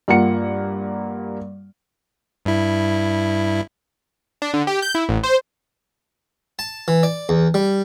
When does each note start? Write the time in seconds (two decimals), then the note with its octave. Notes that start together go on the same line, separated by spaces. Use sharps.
0.08 G2 A#3 F4 F#5 C#7
2.45 G2 E4
4.42 D4
4.54 D3
4.67 G4
4.82 G6
4.95 E4
5.09 A1
5.23 C5
6.59 A5
6.88 E3
7.03 D5
7.29 E2
7.54 G3